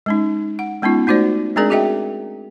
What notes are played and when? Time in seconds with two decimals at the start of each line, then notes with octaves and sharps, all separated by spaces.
0.06 G#3 C#4 D#4
0.59 F#5
0.82 G#3 B3 C#4 D#4 F4
1.07 A3 D#4 F#4 C5 D5
1.56 G#3 C4 D4 G#4 A#4 D5
1.70 F#4 G#4 D#5 E5 G5